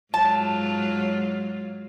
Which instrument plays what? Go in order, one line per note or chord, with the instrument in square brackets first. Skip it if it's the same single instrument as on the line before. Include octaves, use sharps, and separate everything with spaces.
[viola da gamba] G#2 F#3 F4 [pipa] A5